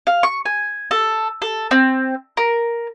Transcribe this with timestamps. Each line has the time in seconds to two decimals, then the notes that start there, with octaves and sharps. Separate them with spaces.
0.07 F5
0.23 C#6
0.46 G#5
0.91 A4
1.42 A4
1.71 C4
2.37 A#4